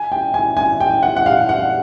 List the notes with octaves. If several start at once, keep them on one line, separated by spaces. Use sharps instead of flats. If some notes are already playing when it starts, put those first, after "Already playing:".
Already playing: G#5
G5
G#5
G#5
G5
F#5
F#5
F5
F#5